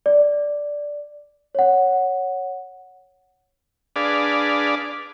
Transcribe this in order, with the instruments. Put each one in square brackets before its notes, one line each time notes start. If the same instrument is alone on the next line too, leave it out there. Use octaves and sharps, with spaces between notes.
[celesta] D5
C#5 F#5
[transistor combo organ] D4 G#4 B4 D5 F5